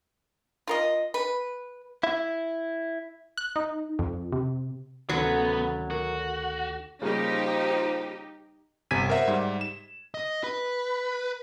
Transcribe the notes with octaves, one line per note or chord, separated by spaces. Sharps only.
F4 A#4 D#5
B4
E4 E5
F#6
D#4
F2
C3
D2 C3 D#3 F#3 B3 C#4 D4
F#4 A#4
C#3 F3 G3 A#3 D#4 G4
G1 C3 G#5 G#6 B6 D#7
A#4 C5 E5 F#5
G#2 G3
E7
D#5
B4